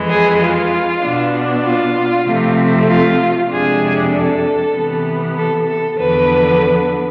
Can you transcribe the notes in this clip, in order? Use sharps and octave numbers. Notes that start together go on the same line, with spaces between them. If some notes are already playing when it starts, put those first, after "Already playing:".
Already playing: F2 E3 G#3
G#4
F4
B2 B3 D4
F4
C3 F3 A3 C4
F4
F2 C3 G#3 D4 G#4
A4
C3 E3 B3
A4
A4
E2 D3 F3 B3 D4 B4